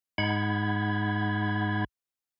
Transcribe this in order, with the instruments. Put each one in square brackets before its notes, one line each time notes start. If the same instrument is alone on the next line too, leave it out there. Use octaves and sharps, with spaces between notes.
[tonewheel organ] G#2 G#3 D#4 F#5 B5 G#6